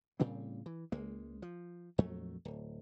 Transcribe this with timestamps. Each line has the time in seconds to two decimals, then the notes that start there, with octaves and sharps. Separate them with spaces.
0.20 A2 C#3 G3 C4
0.66 E3
0.92 C#2 G#3 A#3
1.42 F3
1.98 A#1 F2 F#3 A3
2.45 D1